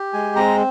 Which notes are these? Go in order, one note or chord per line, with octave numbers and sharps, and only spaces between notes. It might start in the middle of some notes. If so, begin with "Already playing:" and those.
Already playing: G4
G#3 G#5
C4 A#5